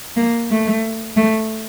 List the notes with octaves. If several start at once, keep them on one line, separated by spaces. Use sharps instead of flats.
A#3
A3
A3